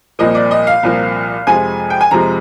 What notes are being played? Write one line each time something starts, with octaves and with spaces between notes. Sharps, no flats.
C2 A#2 F3 A#3 D#5
D5
D#5
F5
C2 A#2 F3 A#3
F2 C3 F3 G#3 G#5
G5
G#5
F2 C3 F3 G#3 A#5